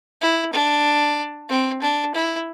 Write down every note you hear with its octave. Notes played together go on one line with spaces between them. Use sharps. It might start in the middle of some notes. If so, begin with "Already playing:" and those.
E4
D4
C4
D4
E4